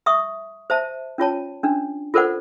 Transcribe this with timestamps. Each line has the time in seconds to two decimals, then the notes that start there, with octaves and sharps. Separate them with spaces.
0.06 E5 C#6 D#6
0.70 C5 E5 A5
1.18 C#4 F4 C#5 A5
1.63 C#4 D4
2.14 F4 A4 A#4 C5 D5 F#5